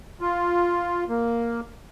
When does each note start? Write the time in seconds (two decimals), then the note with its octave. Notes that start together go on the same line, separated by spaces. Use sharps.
0.21 F4
1.09 A#3